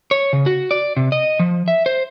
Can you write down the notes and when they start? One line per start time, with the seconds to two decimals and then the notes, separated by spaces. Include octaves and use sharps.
0.11 C#5
0.33 C#3
0.46 F#4
0.71 D5
0.97 C3
1.12 D#5
1.39 F3
1.68 E5
1.86 C5